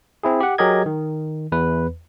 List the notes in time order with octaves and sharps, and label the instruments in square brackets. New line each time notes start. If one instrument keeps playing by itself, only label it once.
[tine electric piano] C4 E4 G#4
G4 F#5
F#3 G4 G#4 A#4 D#5 G#6
D#3
E2 B4